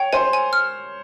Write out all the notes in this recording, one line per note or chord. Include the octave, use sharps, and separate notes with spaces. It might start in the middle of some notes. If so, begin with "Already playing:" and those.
Already playing: C#5 G5
C5 G#5
G#5
F6